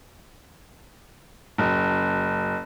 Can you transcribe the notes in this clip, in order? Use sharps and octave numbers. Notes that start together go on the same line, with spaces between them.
F#1